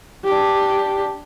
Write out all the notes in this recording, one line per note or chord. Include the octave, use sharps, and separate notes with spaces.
D4 G4